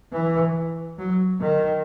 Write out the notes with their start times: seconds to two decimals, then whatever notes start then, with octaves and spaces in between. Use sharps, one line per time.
0.13 E3
0.98 F#3
1.41 D#3